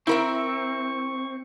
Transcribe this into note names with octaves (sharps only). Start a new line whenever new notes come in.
C4 E4 A#4 E5 C#6